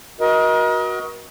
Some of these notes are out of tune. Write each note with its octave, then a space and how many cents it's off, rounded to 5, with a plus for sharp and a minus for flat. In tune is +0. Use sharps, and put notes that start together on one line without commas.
F#4 +0 A#4 +40 D#5 +25